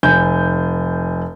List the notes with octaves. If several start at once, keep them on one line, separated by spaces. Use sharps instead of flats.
F1 G#5 G6